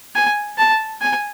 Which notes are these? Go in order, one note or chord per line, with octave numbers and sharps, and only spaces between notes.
G#5
A5
G#5